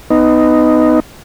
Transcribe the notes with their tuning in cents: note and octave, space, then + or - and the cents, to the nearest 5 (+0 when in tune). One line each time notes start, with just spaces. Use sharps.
B3 +20 D#4 +0